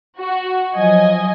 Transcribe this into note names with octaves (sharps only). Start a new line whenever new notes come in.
F#4
F3 F#3 D#5 G#5